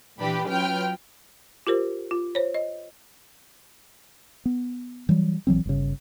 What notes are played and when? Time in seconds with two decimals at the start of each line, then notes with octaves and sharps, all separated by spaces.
0.19 A#2 E3 D4 G4 B4 B5
0.47 F#3 C#4 F4 B4 G5 F6
1.67 F4 G4 A#4 C5
2.11 F4
2.35 C5 C#5
2.54 D#5
4.45 B3
5.09 E3 F#3 G3
5.47 A#1 E3 F#3 C4
5.66 G1 C#3